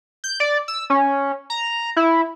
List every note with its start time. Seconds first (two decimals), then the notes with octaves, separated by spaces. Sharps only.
0.24 G6
0.40 D5
0.68 E6
0.90 C#4
1.50 A#5
1.97 E4